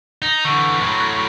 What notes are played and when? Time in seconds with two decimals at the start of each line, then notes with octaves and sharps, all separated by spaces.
0.22 D#4 A#6 F7
0.45 D3 E3 C#6 G6
0.80 A2 F#3 B5 C6 F#6
1.01 F#6